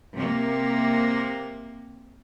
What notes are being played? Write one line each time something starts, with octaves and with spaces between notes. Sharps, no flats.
C3 A#3